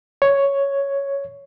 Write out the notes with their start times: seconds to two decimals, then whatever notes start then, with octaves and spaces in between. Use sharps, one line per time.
0.22 C#5